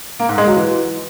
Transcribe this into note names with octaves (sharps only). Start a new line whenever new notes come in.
A#3
G#2
G#3
F#3
E3